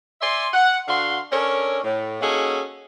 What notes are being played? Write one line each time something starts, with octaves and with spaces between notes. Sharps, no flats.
D5 E5 G#5 C6
F#5
D3 F#4 F5 C6
C#4 D4 A4 A#4 C#5
A2
A#3 C#4 D#4 F#4 G#4 A4